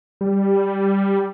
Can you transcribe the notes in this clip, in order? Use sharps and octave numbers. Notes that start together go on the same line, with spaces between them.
G3